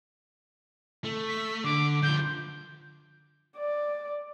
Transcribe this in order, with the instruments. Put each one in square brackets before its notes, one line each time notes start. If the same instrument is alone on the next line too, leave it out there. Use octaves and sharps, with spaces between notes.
[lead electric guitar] A3
[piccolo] B6
[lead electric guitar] D3 [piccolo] D6
[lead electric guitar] D3 F3 [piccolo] G6
[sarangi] D5